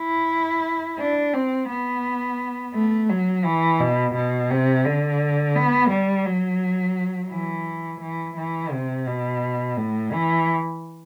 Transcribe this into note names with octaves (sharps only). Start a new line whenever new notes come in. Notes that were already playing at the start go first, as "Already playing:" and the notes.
Already playing: E4
D4
C4
B3
A3
F#3
E3
B2
B2
C3
D3
B3
G3
F#3
E3
E3
E3
C3
B2
A2
E3